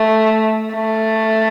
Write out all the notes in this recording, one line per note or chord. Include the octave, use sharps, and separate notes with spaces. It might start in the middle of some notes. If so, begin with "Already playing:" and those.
Already playing: A3
A3